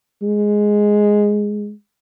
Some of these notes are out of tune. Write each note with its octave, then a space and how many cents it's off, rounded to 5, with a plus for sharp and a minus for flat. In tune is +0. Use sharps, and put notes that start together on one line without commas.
G#3 +0